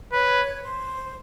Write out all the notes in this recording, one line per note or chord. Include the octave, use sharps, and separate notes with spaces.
B4 C#5
C5